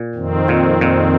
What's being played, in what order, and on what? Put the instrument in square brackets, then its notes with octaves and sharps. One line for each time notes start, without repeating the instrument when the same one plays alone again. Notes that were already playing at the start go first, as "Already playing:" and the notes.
Already playing: [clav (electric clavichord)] A#2
[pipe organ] F2 D#3 C4
[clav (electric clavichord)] A#2
A#2